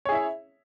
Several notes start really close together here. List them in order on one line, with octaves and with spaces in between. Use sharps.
C#5 G#4 E4 E5